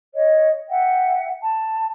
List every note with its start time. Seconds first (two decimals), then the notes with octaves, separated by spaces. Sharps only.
0.12 C#5 D#5
0.70 E5 F#5 G5
1.39 A5